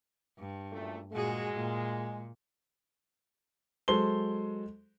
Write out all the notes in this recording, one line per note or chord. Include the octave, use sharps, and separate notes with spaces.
G2
F#2 A#2 A3
A#2 G#3 F#4 G#4
A#2
F#3 G#3 A4 C5 C6 G7